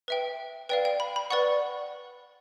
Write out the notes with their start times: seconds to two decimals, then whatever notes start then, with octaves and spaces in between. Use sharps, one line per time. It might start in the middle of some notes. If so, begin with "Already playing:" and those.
0.08 B4 E5 G5
0.69 B4 D5 F5 G5
0.85 G5
1.00 B5
1.16 B5
1.30 B4 D5 F#5 C#6